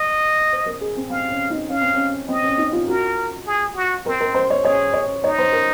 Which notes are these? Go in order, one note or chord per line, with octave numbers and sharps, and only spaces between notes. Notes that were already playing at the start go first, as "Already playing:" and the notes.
Already playing: D#5
C5
A#4
G#4
C4
C4 F5
C#4
D#4
C#4 F5
C4
C#4
C4 D#5
C#4
D#4
F4
F#4 A#4
G#4
F#4
C4 A#4
A#4
C5
C#5
G#4 C#5
C#5
D#4 C#5
C5
A#4